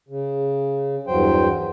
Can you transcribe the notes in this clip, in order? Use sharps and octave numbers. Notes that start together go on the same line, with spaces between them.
C#3
E2 G2 F#3 C5 G5